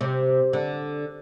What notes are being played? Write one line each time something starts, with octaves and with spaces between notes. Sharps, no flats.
C3
D3